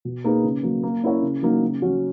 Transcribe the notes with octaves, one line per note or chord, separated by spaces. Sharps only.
B2
A#3 D#4 G#4 B4
C#3
F#3 A#3
A#3
C#4 E4 A#4 C#5
C#3
F#3 A#3 D#4
C#3
F#3 C#4 F#4